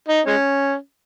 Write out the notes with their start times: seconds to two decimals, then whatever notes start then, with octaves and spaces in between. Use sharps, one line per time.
0.09 D#4
0.26 G#3 C#4